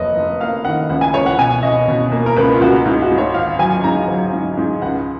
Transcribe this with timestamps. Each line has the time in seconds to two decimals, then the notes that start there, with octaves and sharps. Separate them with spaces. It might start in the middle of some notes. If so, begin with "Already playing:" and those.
Already playing: F1 F2 A#3 A#4 B4 C#5 D#5
0.16 F1
0.40 A#3 F5
0.65 D#3 F#5
0.89 C#2 F#5
1.01 G#5
1.14 C#2 C#5
1.26 F#5
1.38 B2 G#5
1.63 B2 D#5
1.88 B2
2.12 A#3
2.26 A#4
2.37 C#2 B4
2.54 F4
2.61 C#2 F#4
2.86 G#2 F4
3.02 F#4
3.11 G#2
3.18 C#5
3.34 G#1 F5
3.59 F#3 G#5
3.84 G#2 A#5
4.08 F#3
4.32 G#2
4.57 G#2
4.82 C#2 F#5